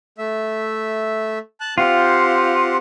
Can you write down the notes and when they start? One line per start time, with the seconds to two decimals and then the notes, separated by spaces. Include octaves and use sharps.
0.18 A3 E5
1.60 A5 F#6
1.78 C4 F4 G4 F#5